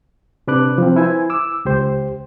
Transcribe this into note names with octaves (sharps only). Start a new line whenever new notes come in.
C3 D4 B4 D6 F#6
F3 C4
E4 B4 C5 G#5
D6 E6
C#2 G4 C5